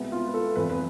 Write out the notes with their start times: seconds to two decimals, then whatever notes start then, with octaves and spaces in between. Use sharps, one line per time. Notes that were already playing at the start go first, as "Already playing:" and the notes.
Already playing: C2 B2 G#3 B3
0.12 F4
0.27 B4
0.34 A4
0.56 F1 E2 C3 B4
0.70 B4